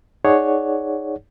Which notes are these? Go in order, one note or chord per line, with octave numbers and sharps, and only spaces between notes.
D#4 G#4 C#5 D5 F#5